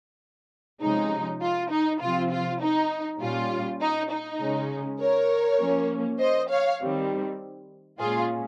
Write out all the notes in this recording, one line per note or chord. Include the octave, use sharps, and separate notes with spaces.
C3 F3 G#3 C#4 D#4
F4
D#4
C3 F3 C4 F4
F4
D#4
A#2 G3 C#4 F4
D#4
D#4
C#3 G#3 C#4
A#4 C#5
F3 A#3 C#4
C5 D#5
C#5 F5
D#3 G3 C4
A#2 G#3 C#4 F4 G#4